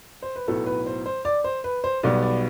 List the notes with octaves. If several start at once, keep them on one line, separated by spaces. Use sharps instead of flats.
C5
B4
B1 A2 F#3 B3 A4
B4
C5
C5
D5
C5
B4
C5
B1 B2 G3 B3 D5
D5